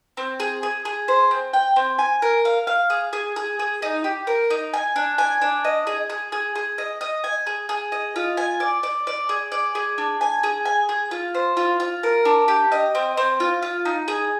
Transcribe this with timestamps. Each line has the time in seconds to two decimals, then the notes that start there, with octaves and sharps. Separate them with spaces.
0.17 C4
0.40 G#4
0.63 G#4
0.85 G#4
1.08 C5
1.31 C4
1.53 G5
1.76 C4
1.99 G#5
2.22 A#4
2.45 F5
2.67 F5
2.90 G#4
3.13 G#4
3.36 G#4
3.59 G#4
3.82 D#4
4.04 G4
4.27 A#4
4.50 D#4
4.74 G#5
4.96 D4
5.18 G#5
5.42 D4
5.64 D#5
5.87 G#4
6.10 G#4
6.32 G#4
6.55 G#4
6.78 D#5
7.01 D#5
7.24 G#5
7.47 G#4
7.69 G#4
7.92 D#5
8.16 F4
8.37 G#5
8.60 D5
8.83 D5
9.07 D5
9.29 G#4
9.52 D5
9.75 G#4
9.98 D4
10.21 G#5
10.43 G#4
10.65 G#5
10.89 G#4
11.11 F4
11.34 C5
11.57 F4
11.80 F4
12.03 A#4
12.25 D4
12.48 G4
12.72 D#5
12.95 C4
13.17 C4
13.40 F4
13.62 F4
13.85 D#4
14.08 G#4